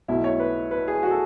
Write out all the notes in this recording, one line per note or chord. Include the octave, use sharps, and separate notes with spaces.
B1 B2 A3 E4
C#5
B4
B4
G#4
F#4
A4